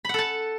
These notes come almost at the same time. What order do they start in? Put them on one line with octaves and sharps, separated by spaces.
B5 F#5 A4 A5